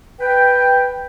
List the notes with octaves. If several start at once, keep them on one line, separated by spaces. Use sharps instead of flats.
B4 G5